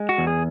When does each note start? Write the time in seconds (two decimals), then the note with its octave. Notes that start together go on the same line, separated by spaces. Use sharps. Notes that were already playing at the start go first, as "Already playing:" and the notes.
Already playing: G#3
0.09 F#4
0.18 E2
0.27 G#4